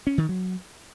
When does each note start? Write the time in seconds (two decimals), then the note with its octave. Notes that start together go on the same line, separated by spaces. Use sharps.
0.07 C#4
0.18 D#3
0.29 F#3